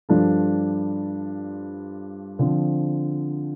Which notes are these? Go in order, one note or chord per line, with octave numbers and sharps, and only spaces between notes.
G2 F3 D4 F4 A4
D3 F3 C4